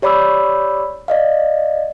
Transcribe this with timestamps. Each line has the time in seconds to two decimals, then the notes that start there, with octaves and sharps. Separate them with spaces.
0.02 G4 C#5 D5 B5 D6 E6
1.08 D5 D#5 F5